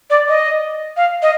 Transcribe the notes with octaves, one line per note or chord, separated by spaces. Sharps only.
D5
D#5
F5
D#5